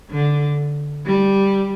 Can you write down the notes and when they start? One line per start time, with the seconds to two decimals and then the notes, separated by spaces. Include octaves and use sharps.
0.11 D3
1.05 G3